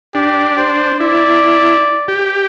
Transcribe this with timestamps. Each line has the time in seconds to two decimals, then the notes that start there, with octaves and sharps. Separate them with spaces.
0.15 D4 G4
0.58 C5
1.00 E4 D5
2.08 G4